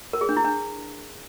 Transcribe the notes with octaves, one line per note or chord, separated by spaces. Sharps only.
A#4
G#4
D4
E4
D4